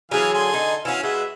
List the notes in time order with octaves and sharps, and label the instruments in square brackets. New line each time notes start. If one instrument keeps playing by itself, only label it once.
[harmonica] E3 F5 G#5 [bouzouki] F#3 G#4
[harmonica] D3 G#5 C6
[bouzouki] D#4
[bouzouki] E3 C#4 [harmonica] F#4 F5
[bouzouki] G#3 [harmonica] F#4 B4 E5